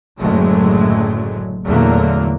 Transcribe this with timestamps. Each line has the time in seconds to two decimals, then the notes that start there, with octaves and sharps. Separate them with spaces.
0.18 F#1 A2 D3 F#3 G#3 A3
1.64 E2 A#2 D3 F#3 A3 A#3